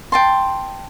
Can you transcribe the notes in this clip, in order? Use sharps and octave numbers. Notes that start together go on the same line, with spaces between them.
G5 A5 C6